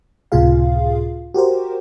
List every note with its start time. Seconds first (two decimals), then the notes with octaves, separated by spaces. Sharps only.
0.32 C#2 A2 C3 F4 G#4 F5
1.34 F#4 G4 A#4 C5